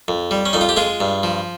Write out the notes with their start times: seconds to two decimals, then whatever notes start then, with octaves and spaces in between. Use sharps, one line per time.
0.08 F2
0.31 G3
0.46 C#4
0.53 F2 D#4
0.61 F4
0.69 G4
0.76 G#3 F4 G#4
1.00 G2
1.23 F3